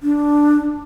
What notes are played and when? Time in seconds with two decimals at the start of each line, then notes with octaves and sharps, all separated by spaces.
0.03 D4